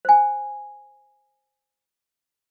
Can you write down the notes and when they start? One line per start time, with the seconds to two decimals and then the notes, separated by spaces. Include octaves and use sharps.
0.05 C5 G#5